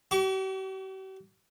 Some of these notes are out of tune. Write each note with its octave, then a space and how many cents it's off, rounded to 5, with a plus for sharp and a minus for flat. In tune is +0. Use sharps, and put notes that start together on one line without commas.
G4 -45 C#6 +40